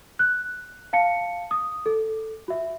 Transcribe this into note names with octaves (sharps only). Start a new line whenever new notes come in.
F#6
F5 A5 C#7
D#6
A4
F#4 E5